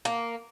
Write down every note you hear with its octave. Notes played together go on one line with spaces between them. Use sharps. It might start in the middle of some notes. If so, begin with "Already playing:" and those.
A#3